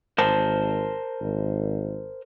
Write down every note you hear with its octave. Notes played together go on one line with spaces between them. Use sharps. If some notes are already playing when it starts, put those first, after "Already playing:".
G#1 A#4 C5 A5
G#1